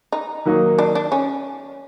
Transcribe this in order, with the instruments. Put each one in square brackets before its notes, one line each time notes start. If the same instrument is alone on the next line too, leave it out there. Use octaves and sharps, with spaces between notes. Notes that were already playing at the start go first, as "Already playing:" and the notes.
[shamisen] D#4
[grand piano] D#3 F#3 A#3 D#4
[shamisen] D4
D4
C#4